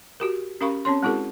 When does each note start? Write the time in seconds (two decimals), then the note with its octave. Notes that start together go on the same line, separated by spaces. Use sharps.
0.20 F#4 G4 A#4
0.61 C#4 G4 A#4 F5 B5 C#6
0.85 C4 C#4 C#5 C6
1.03 G#3 C4 E4 F#4 G#4 A#4